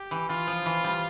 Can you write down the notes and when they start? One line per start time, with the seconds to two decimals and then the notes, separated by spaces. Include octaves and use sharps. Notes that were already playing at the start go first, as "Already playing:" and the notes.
Already playing: G4
0.11 E3
0.29 E3 F4
0.47 F3
0.66 E3
0.84 G3